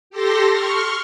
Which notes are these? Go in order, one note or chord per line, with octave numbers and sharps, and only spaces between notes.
G4 A4 C6 A#6
C6 C#6 F6